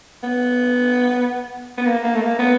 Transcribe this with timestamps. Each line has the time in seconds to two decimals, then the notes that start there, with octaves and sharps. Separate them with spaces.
0.23 B3
1.78 B3
1.86 A#3
2.04 A#3
2.14 A3
2.22 A#3
2.39 B3